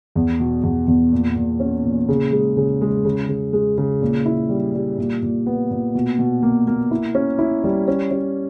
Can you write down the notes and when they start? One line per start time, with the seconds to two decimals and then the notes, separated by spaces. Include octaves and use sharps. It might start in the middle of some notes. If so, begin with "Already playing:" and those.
0.15 E2
0.40 B2
0.63 E2
0.87 E2
1.12 A#2
1.36 A#2
1.60 C#4
1.84 A#2
2.09 C#3
2.32 G#3
2.57 C#3
2.81 G#3
3.05 C#3
3.29 C#3
3.53 G#3
3.78 C#3
4.02 A#2
4.26 E4
4.49 G3
4.74 G3
4.98 A#2
5.22 A#2
5.46 B3
5.71 A#2
5.95 B2
6.19 B2
6.43 A#3
6.67 A#3
6.91 E4
7.15 C#4
7.38 E4
7.64 G3
7.88 C#4
8.11 C#4